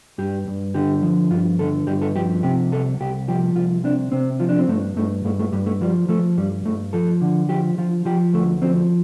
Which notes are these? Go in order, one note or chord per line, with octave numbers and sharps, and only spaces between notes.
G2 G4
G2
D3 G4
F3
G2 F4
D3 A4
G2 G4
A4
F3 G4
C3 G4
C2 A4
C2 G4
F3 G4
C2 F4
C3 D4
C3 C4
F3 F4
D4
C4
G2 A3
G2 A3
G2 A3
A3
G2 G3
A3
F3 G3
F3 A3
G2 G3
G2 A3
F3 A4
D3
F3 G4
F3 F4
F3 G4
D2 A3
F3 C4